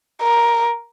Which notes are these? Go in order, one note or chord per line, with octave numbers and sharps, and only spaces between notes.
A#4